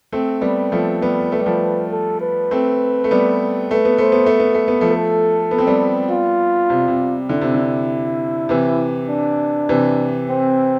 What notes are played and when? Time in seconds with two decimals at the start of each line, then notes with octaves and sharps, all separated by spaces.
0.12 A3 C4
0.41 G3 B3
0.72 F3 A3
1.02 G3 B3
1.32 A3 B4
1.39 G3
1.46 F3 A3
1.92 A4
2.21 B4
2.51 A3 C4
3.04 A3
3.11 G3 B3
3.71 A3 B4
3.85 B3
3.98 A3 C5
4.12 B3
4.26 A3
4.39 B3
4.54 A3
4.68 B3
4.81 F3 A3
4.91 A4
5.51 B3
5.58 C4
5.67 G3 B3
6.10 F4
6.70 C3
6.88 C3
7.29 D3 E4
7.41 C3
7.54 D3
8.49 C3 E3
9.09 D4
9.69 C3 E3
10.30 C4